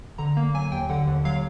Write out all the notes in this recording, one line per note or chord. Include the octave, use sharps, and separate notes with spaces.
D3 A#5
A#3
F#3 G#5
D#2 G5
D3 F#5
D#2
F#3 F5